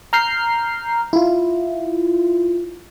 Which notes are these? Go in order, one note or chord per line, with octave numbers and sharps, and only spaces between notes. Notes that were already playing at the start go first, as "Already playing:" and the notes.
A#5 F6 G6 C7
E4 F4